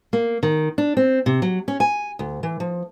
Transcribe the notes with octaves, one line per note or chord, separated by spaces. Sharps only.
A#3
D#3
D4
C4
C3
F#3
C#4
G#5
D2
E3
F3